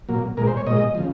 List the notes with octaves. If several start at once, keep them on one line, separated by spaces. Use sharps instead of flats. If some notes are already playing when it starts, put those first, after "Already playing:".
A#2 F#3 A#3
A#2 G#3 A#4
C5
C#5
A#2 G#3 D#5
C#3 F3